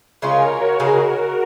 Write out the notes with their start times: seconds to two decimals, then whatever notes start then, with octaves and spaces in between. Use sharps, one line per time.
0.22 C#3 G#3 C#4 F4 A#4 C#5
0.51 F#4 A#4
0.80 C#3 G#3 D#4 F#4 G#4 A#4